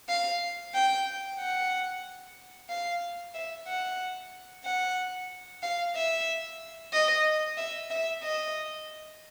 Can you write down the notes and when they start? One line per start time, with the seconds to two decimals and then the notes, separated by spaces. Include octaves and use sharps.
0.09 F5
0.74 G5
1.39 F#5
2.69 F5
3.34 E5
3.67 F#5
4.65 F#5
5.62 F5
5.95 E5
6.93 D#5
7.57 E5
7.90 E5
8.23 D#5